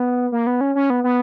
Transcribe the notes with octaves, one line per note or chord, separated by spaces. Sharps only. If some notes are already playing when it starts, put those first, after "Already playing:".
Already playing: B3
A#3
B3
C#4
C#4
B3
B3